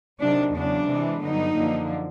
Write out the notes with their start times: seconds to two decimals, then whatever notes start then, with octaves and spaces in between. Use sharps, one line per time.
0.20 C3 D#3 F#3 D4
0.55 E2 C#3 F#3 D4
0.88 C3 E3 G#3
1.21 G2 D3 F#3 B3 D#4
1.55 F#2 D3 F3 A#3